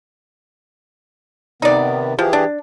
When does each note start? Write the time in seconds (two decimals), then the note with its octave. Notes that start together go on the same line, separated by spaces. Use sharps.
1.62 C3 D#3 B3 D#4 D5
2.19 E3 F3 G4 G#4
2.33 D4